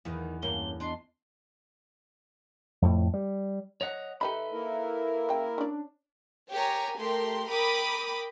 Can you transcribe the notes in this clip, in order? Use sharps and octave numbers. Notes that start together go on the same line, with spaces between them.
E2 D#3 B3
G2 A#3 C#4 G7
B3 D4 D#5 C6
F2 A2
G3
C#5 D#5 F#5
D#3 D#4 G4 A4 B4 E5 B5
A#3 E4 A#4
C#3 G5
C#4 D4 D5
G4 A#4 C#5 G#5 A#5
A3 G4 A#4 C6
A#4 G5 B5 D6 D#6